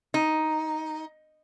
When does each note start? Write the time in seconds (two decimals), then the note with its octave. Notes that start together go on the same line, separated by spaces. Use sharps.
0.14 D#4